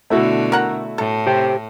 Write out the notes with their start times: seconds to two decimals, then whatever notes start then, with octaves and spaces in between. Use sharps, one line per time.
0.10 B2 D3 A3 E4 F#4
0.52 A#4 F#5 A#5
0.98 A2 A4
1.27 G4 C5 G5